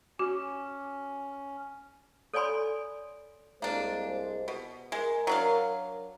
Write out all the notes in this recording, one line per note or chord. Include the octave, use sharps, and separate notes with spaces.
C#4 F#4 D6
A4 C#5 D5 G#5 B5 C6
C2 G#3 A#3 D4 C5
B2
G#3 A#4
F#3 D4 F5